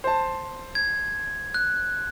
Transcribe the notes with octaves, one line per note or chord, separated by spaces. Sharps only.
C5 A5
G#6
F#6